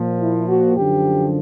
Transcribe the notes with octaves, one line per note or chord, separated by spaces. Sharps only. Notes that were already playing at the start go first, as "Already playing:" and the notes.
Already playing: A#2 F3
E4
F#4
F#2 D3 F3 G4